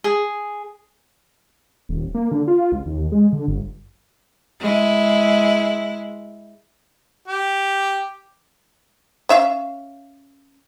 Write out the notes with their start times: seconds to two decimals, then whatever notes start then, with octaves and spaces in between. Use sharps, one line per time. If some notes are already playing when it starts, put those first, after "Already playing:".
0.04 G#4
1.89 D#1
2.15 A#3
2.32 D3
2.48 F4
2.72 C#2
2.86 D#2
3.12 G#3
3.33 D3
3.48 G1
4.60 G#3 E4
7.27 G4
9.29 C#4 E5 F5